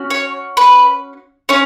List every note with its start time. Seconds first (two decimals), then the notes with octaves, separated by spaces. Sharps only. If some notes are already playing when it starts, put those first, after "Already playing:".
Already playing: C#4 F#4
0.10 C#5
0.57 B4
1.49 C#4 C#5